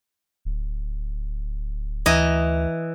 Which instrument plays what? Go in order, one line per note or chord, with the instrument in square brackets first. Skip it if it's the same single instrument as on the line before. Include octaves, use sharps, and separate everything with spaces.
[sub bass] D1
[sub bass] D2 [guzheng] E3 D#5 A#5